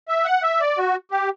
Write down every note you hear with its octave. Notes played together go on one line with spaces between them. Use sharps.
E5
F#5
E5
D5
F#4
G4